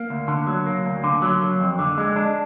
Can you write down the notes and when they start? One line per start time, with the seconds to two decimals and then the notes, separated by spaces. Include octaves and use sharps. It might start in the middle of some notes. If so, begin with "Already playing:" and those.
Already playing: A#3
0.10 D2
0.28 D3
0.47 F#3
0.66 A#3
0.85 D2
1.04 D3
1.22 F#3
1.42 A#3
1.60 F2
1.79 D3
1.98 G#3
2.16 D4